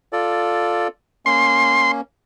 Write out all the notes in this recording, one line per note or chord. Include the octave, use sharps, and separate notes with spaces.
F4 A4 D5
A#3 C#4 C6